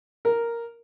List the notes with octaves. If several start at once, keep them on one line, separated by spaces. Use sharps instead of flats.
A#4